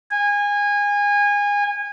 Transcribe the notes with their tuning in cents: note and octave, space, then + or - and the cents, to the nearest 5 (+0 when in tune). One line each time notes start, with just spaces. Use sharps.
G#5 -25